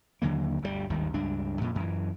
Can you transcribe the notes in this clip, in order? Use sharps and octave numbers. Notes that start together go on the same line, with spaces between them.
D#2 D3 F#3 A#3
G1 D2 B2 G3
G#1 D#2 D#3 G3
C#2 G2 D4
F2 A#2
F#2 E3